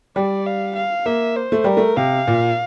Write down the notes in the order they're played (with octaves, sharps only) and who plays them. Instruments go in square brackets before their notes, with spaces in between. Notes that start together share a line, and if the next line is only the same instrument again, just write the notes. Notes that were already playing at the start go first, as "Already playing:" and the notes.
[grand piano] G3 [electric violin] D5
[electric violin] F5
F5
[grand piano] A#3 [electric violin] E5
[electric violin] C5
[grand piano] A3
[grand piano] G3 [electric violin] A#4
[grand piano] A3
[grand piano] C3 [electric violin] F5
[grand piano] A#2